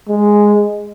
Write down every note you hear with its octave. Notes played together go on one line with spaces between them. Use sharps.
G#3